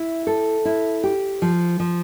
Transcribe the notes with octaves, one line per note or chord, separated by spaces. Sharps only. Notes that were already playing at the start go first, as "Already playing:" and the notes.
Already playing: E4
A4
E4
G4
F3
F3